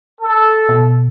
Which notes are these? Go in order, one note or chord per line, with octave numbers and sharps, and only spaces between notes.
A4
B2